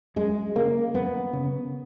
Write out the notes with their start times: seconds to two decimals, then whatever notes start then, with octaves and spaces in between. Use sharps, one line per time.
0.16 F#2 G#3
0.55 C#3 A#3
0.94 F#2 B3
1.33 C#3